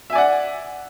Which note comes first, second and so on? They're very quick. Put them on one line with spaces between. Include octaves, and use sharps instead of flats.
E5 G#5 D5 F#5